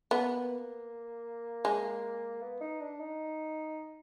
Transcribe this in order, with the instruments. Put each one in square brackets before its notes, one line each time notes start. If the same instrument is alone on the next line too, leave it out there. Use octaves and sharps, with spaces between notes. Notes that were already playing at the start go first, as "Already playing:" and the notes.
[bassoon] A#3 [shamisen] B3
[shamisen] G#3
[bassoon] B3
D#4
D4
D#4